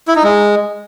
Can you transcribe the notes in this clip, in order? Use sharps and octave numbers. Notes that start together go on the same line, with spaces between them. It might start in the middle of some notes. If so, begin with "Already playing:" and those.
E4
D#4
G#3